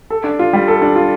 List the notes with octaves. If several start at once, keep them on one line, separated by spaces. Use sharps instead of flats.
A4
D4
F4
G3
A4
D4
F4